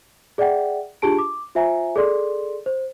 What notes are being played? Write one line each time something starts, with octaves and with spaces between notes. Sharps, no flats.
G#4 D5 E5 F#5 G5
D4 F4 G4 G#4 A5 D7
D6
F4 C5 E5 G#5 A#5
G#4 A4 D5 C6
C5